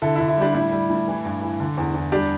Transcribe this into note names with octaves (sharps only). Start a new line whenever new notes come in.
D3 E4 A4
E4
D3
E4
G3 D4 G4
A2 E4
G3
A2
E3
G2
E3
D3
E2
E2
G3 D4 G4